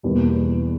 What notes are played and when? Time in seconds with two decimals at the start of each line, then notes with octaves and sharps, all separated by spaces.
0.03 E2 B2 G3 A#3